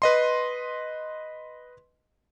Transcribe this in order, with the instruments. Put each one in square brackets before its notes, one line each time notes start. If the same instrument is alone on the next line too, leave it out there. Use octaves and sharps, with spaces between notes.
[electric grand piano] B4 D#5 C6